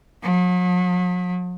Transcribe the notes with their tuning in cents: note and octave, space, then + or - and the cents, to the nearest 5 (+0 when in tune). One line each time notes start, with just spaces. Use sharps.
F#3 -45